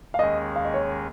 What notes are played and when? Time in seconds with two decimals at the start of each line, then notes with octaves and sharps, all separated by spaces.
0.14 F5
0.19 D#2 D#3 G#3 C#4 G#4 D#5
0.56 F5
0.65 D#5
0.74 C#5